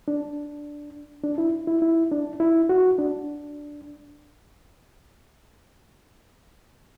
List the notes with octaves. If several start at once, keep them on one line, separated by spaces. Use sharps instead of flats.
D4
D4
E4
E4
E4
D4
E4
F#4
D4